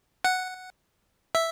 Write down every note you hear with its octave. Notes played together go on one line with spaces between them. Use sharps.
F#5
E5